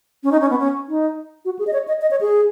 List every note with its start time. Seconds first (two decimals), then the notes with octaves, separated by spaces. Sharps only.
0.23 C#4
0.32 D#4
0.41 C#4
0.50 B3
0.59 C#4
0.88 D#4
1.45 F#4
1.59 G#4
1.67 D#5
1.73 C#5
1.88 D#5
2.02 D#5
2.11 C#5
2.21 G#4